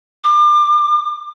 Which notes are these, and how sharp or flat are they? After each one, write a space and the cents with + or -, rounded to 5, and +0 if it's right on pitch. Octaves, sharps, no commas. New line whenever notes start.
D6 +35